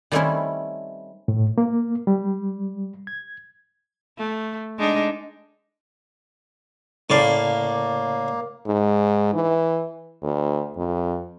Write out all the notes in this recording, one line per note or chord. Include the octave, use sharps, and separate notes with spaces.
D#3 G3 A3 C4 C#4 E4
A2
A#3
G3
G#6
A3
G#3 D4 D#4
A2 C#3 A#3 D5 F5 A5
G#2
E3
D2
F2